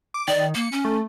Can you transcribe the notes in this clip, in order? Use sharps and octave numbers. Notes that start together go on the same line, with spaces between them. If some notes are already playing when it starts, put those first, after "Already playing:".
D6
D#3 D5
A#3 C#7
C#4
A3